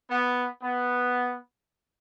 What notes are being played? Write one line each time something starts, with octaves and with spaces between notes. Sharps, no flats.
B3
B3